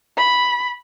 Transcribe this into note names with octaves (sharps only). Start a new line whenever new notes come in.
B5